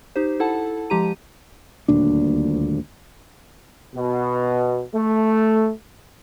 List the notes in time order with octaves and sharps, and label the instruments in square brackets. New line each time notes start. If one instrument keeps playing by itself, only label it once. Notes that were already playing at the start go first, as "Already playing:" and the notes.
[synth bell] D#4 G4 C5
E4 A4 F#5 A5
F3 G#3 G4 A#5 D#7
[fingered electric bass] D#1 D2 A#2 D4
[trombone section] B2
A3